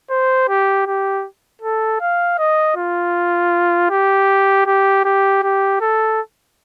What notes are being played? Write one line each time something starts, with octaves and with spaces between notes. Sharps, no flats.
C5
G4
G4
A4
F5
D#5
F4
G4
G4
G4
G4
A4